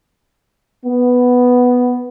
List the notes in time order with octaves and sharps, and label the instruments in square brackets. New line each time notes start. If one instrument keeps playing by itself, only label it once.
[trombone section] B3